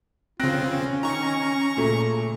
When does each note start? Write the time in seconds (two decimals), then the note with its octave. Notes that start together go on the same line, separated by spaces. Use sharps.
0.40 C#3 C4 F4 F#6 A#6 D7
0.70 C#4
1.03 D#3 A#5 C#6
1.77 A#2 C#3 A3